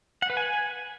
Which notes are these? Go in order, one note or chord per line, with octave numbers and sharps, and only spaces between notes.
F#5
B4
G#5